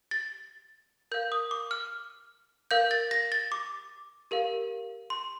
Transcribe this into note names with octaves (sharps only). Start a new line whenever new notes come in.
A6
A#4 F5 G6
D#6
D6
F6
A#4 F5 G6
A6
A#6
A6
D6
G4 A#4 F5
C6